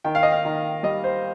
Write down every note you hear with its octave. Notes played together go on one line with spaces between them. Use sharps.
D#3 G5
F5
D#5
F5
D#3
G3 D#5
C5